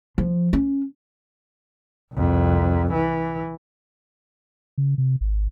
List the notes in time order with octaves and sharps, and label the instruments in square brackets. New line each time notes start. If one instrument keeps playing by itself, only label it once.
[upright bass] F3
C#4
[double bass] C2 F2
E3
[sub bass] C#3
C3
G#1